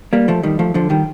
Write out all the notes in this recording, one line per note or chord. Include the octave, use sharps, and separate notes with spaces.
G3 A#3
F3 A3
D#3 G3
F3 A3
D3 F3
D#3 G3